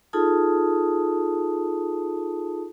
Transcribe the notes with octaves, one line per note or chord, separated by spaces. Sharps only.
D#4 F4 G#4 A4 A5 D#6